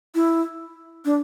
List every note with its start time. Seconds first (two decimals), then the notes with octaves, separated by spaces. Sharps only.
0.15 E4
1.05 D4